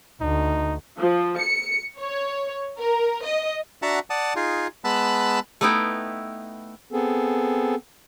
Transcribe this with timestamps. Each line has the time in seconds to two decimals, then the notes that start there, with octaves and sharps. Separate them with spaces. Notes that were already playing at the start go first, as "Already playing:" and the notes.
0.21 D2 D#4
0.99 F3
1.38 C#7
1.99 C#5
2.79 A#4
3.25 D#5
3.82 D4 F#4 E5 F#5 A5 A#5
4.10 D5 F#5 A5 D#6
4.36 D#4 F4 G#4
4.84 G#3 B3 A5 B5 E6 F#6
5.61 A3 B3 D#4 E4 G5
6.92 B3 C4 G#4 A4